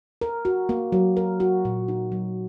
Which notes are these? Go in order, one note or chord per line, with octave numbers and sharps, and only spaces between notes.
A#4
F#4
A#3
F#3
A#4
F#4
A#2
D#4
F#3